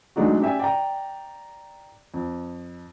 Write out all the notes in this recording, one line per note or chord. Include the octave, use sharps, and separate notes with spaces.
F#3 G#3 A3 D4 D#4 F#4
C#4 G4 D5 E5 G#5
D5 G5 A#5
F2